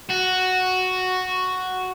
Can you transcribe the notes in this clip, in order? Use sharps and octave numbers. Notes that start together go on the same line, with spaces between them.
F#4